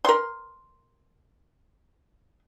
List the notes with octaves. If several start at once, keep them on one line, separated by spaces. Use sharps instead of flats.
A#4 C6